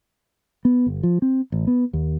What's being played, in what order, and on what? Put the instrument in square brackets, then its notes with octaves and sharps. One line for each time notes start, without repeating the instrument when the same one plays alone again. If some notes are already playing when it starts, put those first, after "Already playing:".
[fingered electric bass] B3
G1
F3
C4
A1
B3
D#2